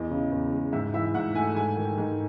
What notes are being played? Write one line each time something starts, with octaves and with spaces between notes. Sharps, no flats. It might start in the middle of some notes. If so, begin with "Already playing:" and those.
Already playing: E2 D#5
C#3
E2
G#3
G#2 E5
E3 E5
G#2 F#5
A3 G#5
G#2 G#5
D#3
G#2